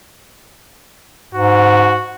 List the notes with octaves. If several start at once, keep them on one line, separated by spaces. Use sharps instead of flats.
G#2 F#4